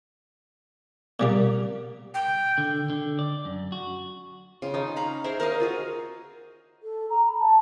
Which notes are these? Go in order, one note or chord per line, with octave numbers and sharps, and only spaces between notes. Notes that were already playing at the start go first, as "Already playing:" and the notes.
A#2 G3 A#3
G5
D3
D3
D5
F#2
F#4
C#3 F4
C#4 D#4
F5 A#5 B5
G#4 A#4 C5 E5
A#4 C5 C#5 D#5 F5
F4 F#4 G#4
A4
A#5
B5
A5